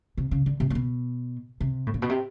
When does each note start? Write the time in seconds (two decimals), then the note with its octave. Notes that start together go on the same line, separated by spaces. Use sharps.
0.17 C3
0.31 C#3
0.46 D3
0.60 C3
0.70 A#2
0.75 B2
1.60 C3
1.87 A2
1.94 A#2
2.02 B2
2.10 C3